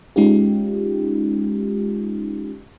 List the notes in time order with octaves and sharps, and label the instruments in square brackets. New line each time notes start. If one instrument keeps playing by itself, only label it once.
[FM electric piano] G#3 C#4 D#4 F4 G4